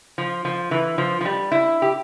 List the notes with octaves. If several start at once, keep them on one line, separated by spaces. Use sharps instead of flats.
F3
F3
E3
F3
F3
G3
E4
G4